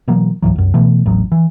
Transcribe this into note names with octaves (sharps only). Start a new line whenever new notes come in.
B2 E3 F#3 A#3
C#2 G#2 E3 F#3
C2 F#2
B2 E3 A3
A1 D#2 A2 F#3
E3